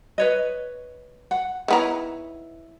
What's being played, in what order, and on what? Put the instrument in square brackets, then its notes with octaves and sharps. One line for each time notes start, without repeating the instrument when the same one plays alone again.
[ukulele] B4 C#5 D#5
F#5
[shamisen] D#3 B3 A#5 [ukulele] E4 C#5